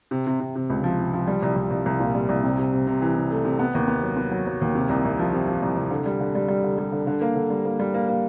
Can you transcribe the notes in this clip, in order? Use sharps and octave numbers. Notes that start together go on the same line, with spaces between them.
C3
C3
C3
C3
C#2
F3
C3
F3
G3
C2
C2
C2
C2
A#2
G3
C2
C3
C3
C3
C3
E3
C3
A3
C3
B3
D#2
B3
F#3
B3
F#3
F#3
D#2
C3
C2
C2
F3
C3
F3
C2
C2
D3
G3
D3
G3
G3
D3
G3
D3
D3
A#3
D3
G3
A#3
G3
A#3
A#3